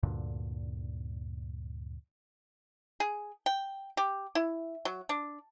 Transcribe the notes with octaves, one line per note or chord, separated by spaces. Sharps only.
D2 G2 A#2 D3
G#4
G5
G4
E4
F#3
D4